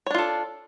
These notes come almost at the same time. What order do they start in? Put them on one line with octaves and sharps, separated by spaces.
C#5 D4 F4 A4